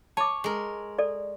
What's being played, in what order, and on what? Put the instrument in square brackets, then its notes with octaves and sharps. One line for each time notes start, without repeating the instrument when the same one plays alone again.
[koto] C#5 [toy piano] A5 D6
[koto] G#3 A#4
[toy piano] A4 D5